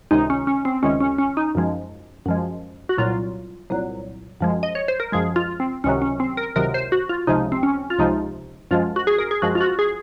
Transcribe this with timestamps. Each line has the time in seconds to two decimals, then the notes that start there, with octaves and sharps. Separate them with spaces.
0.11 C#2 C3 D#3 G#3 D#4
0.30 C#4
0.47 C#4
0.65 C4
0.83 C#2 C3 D#3 G#3 C#4
1.00 C#4
1.18 C#4
1.37 D#4
1.55 F#2 F3 G#3
2.26 F#2 F3 G#3
2.89 F#4
2.97 C2 A#2 F#3 F4
3.70 C2 A#2 F#3
4.41 F#2 F3 G#3
4.63 D#5
4.75 C#5
4.88 C5
5.00 A#4
5.12 F#2 F3 G#3 G#4
5.36 F4
5.60 C4
5.84 C#2 C3 D#3 F#3 C#4
6.02 C#4
6.20 C4
6.37 A#4
6.56 C#2 C3 D#3 F#3 A#4
6.74 C5
6.92 F#4
7.09 F4
7.27 C#2 C3 F3 G#3 D#4
7.52 C4
7.63 C#4
7.90 F4
7.98 C#2 C3 F3 G#3 D#4
8.71 F#2 F3 G#3 F4
8.96 F#4
9.07 G#4
9.18 A#4
9.31 G#4
9.42 F#2 F3 G#3 F#4
9.55 F4
9.61 F#4
9.79 G#4